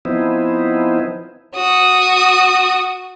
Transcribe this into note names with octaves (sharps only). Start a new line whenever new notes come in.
F3 B3 C4 D#4 E4
F#4 D#6